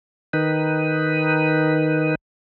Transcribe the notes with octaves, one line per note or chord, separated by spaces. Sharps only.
D#3 D#4 B4